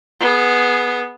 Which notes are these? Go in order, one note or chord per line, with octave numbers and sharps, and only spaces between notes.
B3 G#4